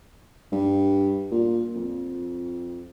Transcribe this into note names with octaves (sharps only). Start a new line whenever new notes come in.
G2
A#2
F2